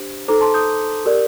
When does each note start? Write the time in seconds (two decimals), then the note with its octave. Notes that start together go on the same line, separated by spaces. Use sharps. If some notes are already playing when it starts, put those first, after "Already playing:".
Already playing: D4 G4 C5
0.28 D#4 A4 C5 A#5 D6
0.41 A5 C6
0.54 D#6 G6
1.05 G4 A#4 D5